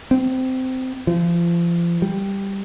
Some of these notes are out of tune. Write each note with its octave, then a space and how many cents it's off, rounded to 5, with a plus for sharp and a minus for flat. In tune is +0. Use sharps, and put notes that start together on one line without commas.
C4 -15
F3 -35
G3 +5